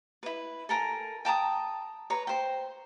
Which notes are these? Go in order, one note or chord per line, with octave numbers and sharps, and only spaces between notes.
E4 B4
A4 A#4 G#5
G5 A5 A#5 D#6
B4 C#5 A#5
C5 G5